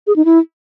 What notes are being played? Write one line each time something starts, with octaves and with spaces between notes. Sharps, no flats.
G#4
D#4
E4